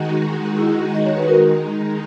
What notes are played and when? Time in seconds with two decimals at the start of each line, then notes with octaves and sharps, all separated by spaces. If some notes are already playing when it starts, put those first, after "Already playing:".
Already playing: D#3 G#3 D#4 F#4
0.58 E4 G#4
0.95 D#5
1.06 C#5
1.17 B4
1.28 D#3 G#3 D#4 F#4 A#4